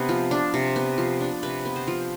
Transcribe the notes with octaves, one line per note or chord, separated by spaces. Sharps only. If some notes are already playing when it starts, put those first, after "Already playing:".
Already playing: C3 B3 D4 B4
F3
D4
C3
B3
F3
D4
C3 B4
B3
C5
F3